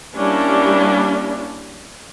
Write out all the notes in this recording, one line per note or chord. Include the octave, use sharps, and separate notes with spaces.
G3 A#3 C#4 D4 E4 G4